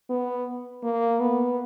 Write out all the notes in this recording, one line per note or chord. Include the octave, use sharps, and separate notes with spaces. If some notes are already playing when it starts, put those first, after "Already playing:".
B3
A#3
B3